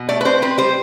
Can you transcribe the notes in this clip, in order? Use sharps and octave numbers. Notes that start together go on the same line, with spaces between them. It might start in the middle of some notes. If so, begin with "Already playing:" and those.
Already playing: B2
A3 D5
B4
C4 C5
C4 B4
G3 C5